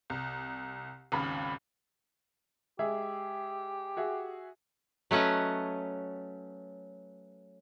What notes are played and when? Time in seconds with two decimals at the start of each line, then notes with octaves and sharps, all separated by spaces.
0.10 C2
1.12 G#1 D#2 C#3 B5
2.79 G#3 G4 G#4 E5
3.97 F#4 G#4 E5
5.11 F#3 A3 C#4 B4 D#5